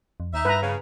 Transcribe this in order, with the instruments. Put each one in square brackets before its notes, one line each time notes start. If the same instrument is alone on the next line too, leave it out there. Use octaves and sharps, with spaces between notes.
[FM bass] F2
[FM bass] D#2 [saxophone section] D#4 E5
[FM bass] G2 [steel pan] B4 A#5
[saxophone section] C#3